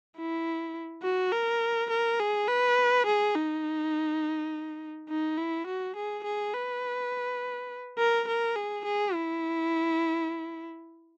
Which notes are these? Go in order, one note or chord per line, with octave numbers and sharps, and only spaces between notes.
E4
F#4
A#4
A#4
G#4
B4
G#4
D#4
D#4
E4
F#4
G#4
G#4
B4
A#4
A#4
G#4
G#4
E4